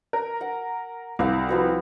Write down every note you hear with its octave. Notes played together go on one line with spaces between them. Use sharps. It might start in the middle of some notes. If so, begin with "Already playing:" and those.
A#4
F#5
C2 F5 F#5
F3 B3 F#4